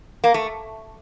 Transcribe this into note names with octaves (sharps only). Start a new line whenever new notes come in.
A#3
A3